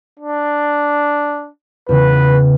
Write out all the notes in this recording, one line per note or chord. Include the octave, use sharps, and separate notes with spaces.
D4
E2 C#3 B4